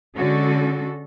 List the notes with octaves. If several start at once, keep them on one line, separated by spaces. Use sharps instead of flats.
D3 G#3 C#4 F#4 A4